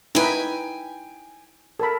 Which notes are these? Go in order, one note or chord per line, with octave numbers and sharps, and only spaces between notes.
D#4 E4 B4 G5 G#5
A4 A#4 B5